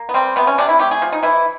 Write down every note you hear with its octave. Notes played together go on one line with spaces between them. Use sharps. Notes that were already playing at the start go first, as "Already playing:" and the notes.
Already playing: A#3
B3
G3 C4
C3 B3
C#4
C3 D4
E4
A3 G4
G#4
F3
D#4
E3 E4